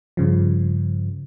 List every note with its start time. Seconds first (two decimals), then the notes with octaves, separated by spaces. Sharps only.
0.17 G2 C#3 F3